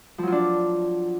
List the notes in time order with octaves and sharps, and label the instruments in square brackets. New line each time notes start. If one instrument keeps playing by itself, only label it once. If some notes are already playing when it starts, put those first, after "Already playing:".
[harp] F3
F#3
F4
D4